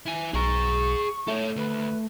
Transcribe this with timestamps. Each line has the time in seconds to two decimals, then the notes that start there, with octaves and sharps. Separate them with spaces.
0.06 E4 G#5
0.34 B1 G#4 A#5 C#6
1.28 A3 A4 C#5
1.56 D2 B4